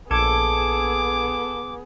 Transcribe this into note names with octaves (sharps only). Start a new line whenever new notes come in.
A#1 B3 G#4 A4 D6 G#6 D7